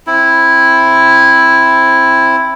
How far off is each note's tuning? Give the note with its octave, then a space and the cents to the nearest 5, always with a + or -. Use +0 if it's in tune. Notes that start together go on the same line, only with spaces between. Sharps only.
C4 +15 E4 +0